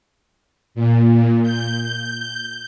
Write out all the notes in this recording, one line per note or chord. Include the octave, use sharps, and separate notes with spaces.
A#2
G6